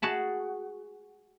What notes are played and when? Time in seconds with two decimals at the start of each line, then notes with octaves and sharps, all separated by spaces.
0.02 F#4 G#4 A5 B5